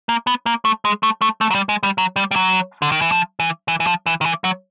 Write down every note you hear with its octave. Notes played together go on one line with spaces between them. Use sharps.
A#3
B3
A#3
A3
G#3
A3
A3
A3
F#3
G3
G#3
G3
F#3
G3
G3
F#3
D3
D#3
E3
F3
E3
E3
E3
F3
E3
D#3
E3
F#3